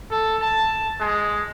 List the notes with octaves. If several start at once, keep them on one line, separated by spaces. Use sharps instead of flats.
A4
A5
G#3